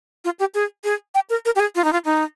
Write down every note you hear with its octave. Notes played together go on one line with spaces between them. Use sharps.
F4
G4
G#4
G#4
G5
A#4
A#4
G4
G#4
F4
D#4
F4
D#4